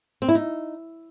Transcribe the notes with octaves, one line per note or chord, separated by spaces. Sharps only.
C4
E4
D#4